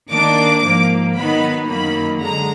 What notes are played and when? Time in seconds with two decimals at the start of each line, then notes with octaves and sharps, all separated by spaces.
0.11 D#3 A#3 D4 D6
0.63 G#2 F3 A#3
1.17 D#3 F#3 B3 D#4 B5
1.69 F#2 D#3 F#3 A#3 B5
2.23 D3 G#3 A#5